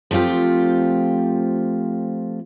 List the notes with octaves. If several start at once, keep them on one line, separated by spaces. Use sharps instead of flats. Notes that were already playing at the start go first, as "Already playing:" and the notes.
F3 A3 C4 F4 G4